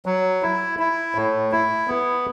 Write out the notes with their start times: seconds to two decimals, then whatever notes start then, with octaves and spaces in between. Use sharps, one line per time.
0.06 F#3
0.43 E4
0.79 E4
1.15 A2
1.52 E4
1.88 B3